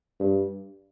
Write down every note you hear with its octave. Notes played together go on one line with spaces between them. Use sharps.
G2